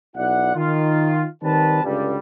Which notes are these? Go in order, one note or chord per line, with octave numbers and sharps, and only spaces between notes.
B1 E4 D5 F#5
D#3 F4
D#3 G3 C4 B4 A5
C#2 G2 D3 G3